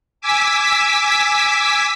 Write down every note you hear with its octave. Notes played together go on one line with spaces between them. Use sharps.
G#5 D6 E6 B6